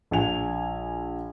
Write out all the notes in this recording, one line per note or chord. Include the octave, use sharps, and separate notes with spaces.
A#1 G#5 F7